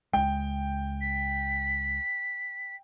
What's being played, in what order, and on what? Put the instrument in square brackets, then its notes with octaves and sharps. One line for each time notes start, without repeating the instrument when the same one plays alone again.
[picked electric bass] C#2 G#3 [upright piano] G5
[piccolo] B6